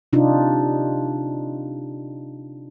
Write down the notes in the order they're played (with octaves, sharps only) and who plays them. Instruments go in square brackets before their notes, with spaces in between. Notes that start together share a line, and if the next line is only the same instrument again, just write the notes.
[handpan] C3 D4 D#4 F4